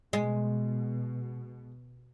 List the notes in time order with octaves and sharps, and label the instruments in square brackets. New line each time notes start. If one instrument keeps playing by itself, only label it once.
[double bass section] B2 [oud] G#3